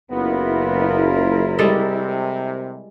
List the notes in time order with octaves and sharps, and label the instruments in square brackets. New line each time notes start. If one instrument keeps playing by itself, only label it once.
[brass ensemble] F#1 F4 [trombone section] B3 [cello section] E4 A#4
[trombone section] C3 [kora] G3 G#3 A4